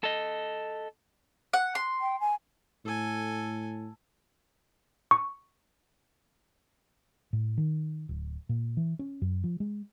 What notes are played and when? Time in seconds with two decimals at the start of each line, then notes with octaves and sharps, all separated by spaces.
0.04 A4 D#5
1.53 F#5
1.75 C6
2.01 G5
2.20 G#5
2.85 A2 A4 G#5
5.11 C#6
7.33 A2
7.58 D#3
8.09 D1
8.49 A#2
8.77 E3
8.99 C#4
9.22 F#2
9.44 F3
9.60 G#3